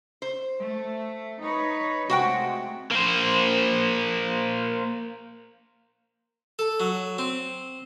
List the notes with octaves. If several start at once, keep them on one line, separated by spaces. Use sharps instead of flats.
C5
A3
D#4 B4 C#5
C3 G#3 A3 F#4 F#5 G5
A#3 C5
A4
F#3
C4